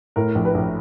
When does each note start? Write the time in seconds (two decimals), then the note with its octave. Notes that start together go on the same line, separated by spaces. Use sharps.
0.16 A2 A#4
0.35 A#1
0.45 B4
0.54 A#1